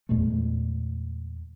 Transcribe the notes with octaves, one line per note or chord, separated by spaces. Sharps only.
E2 A#2 G#3 A3